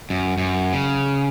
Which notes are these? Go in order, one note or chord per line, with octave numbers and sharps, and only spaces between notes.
F#2
F#2
C#3